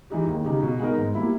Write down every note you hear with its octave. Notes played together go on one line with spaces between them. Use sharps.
E3 G#3 D#4 G4
D#2
C#3 G#3 D#4 G4
B2
G#3 B3 D#4 A#4
G#2
G3 A#3 E4